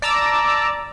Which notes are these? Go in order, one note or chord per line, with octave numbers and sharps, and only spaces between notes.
D5 A5 A#5 D6 E6